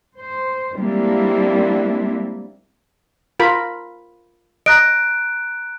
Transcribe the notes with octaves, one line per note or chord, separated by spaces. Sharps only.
C5
G3 G#3 A#3 C4 D4 E4
F4 A#4 B5
D#5 A#5 F#6 D7